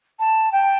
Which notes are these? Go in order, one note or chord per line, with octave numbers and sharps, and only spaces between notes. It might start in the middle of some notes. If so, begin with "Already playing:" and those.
A5
G5